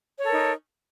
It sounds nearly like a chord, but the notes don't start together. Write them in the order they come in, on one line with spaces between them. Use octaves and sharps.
C#5 A4 A#4 D#4